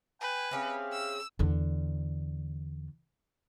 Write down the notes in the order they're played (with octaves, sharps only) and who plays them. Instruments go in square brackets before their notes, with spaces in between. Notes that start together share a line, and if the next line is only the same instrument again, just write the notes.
[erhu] B4 [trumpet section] G5 G#5
[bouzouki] C4 C#4 G#4 [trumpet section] G4 E5 F5
[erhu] E6
[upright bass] E2 D3